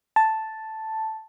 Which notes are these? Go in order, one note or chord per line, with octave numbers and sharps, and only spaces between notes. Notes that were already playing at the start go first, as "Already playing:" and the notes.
A5